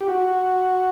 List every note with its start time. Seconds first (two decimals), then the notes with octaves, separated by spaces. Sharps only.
0.01 G4
0.08 F#4